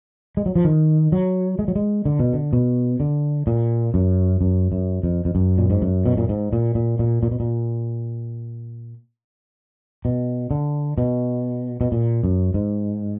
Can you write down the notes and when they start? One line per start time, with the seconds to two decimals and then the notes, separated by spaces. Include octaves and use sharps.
0.37 G#3
0.46 F#3
0.56 F3
0.65 D#3
1.12 F#3
1.59 G#3
1.68 F#3
1.76 G#3
2.05 D3
2.19 B2
2.33 D3
2.53 B2
3.00 D3
3.47 A#2
3.94 F#2
4.41 F#2
4.72 F#2
5.03 F2
5.25 F2
5.35 F#2
5.58 A#2
5.70 G#2
5.82 F#2
6.06 B2
6.17 A#2
6.29 G#2
6.53 A#2
6.75 A#2
6.99 A#2
7.23 A#2
7.31 B2
7.40 A#2
10.05 B2
10.51 D3
10.98 B2
11.81 B2
11.92 A#2
12.24 F#2
12.54 G#2